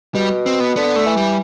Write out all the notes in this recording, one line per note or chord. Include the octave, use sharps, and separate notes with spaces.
B2 G3
C4
B3
D3 B3
A3
E3
G3